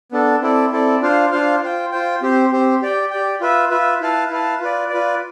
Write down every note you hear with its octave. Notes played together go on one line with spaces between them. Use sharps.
B3 D4 A4
C4 E4 A4 D5
C4 E4 A4 D5
D4 F4 C5 F5
D4 F4 C5 F5
F4 C5 G5
F4 C5 G5
C4 G4 C5
C4 G4 C5
G4 D5 G5
G4 D5 G5
F4 B4 E5
F4 B4 E5
E4 B4 F5 A5
E4 B4 F5 A5
F4 B4 D5
F4 B4 D5